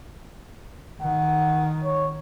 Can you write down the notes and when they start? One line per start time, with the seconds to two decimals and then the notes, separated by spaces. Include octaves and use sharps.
1.01 D#3 F#5
1.84 C#5